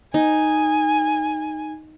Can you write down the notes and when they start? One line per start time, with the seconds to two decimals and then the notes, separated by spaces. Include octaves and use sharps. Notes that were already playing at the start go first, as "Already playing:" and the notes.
0.14 D#4 G#5